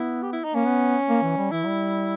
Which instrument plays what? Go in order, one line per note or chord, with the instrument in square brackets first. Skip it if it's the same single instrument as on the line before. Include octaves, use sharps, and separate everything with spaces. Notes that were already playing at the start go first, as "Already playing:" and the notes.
Already playing: [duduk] B3 [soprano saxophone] E4
[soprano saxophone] G4
E4
D#4
[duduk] A#3 [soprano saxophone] C#4
[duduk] B3
A#3
E3
G3
[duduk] E3 [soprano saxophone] E4
[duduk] G3